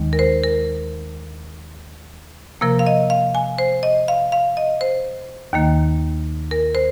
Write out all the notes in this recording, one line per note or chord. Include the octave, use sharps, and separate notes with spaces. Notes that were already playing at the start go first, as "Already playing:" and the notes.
Already playing: D#2 D#3 G#3
A#4
C5
A#4
C3 F3 A#3 A#4
F5
D#5
F5
G#5
C5
D#5
F5
F5
D#5
C5
D#2 D#3 A#3
A#4
C5